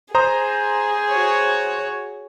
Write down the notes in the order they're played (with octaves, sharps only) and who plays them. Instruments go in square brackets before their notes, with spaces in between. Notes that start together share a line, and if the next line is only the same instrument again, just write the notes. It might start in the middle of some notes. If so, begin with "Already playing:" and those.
[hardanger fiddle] G#4 [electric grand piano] C5 A#5 D#6
[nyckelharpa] F#4 C#5